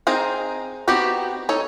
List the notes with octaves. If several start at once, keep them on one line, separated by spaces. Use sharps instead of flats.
C4 D#4 G#4 A#4 C5
B3 C4 D#4 F#4 G4
D#4 A4 C#5